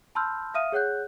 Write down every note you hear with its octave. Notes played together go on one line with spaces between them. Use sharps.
A5 B5 C6 E6 F6 G6
E5 F5 D#6 F6 D#7
G#4 C#5 F#5 F#6 G6